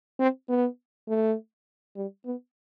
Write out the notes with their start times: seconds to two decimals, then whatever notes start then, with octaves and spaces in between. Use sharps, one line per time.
0.19 C4
0.48 B3
1.08 A3
1.96 G3
2.25 B3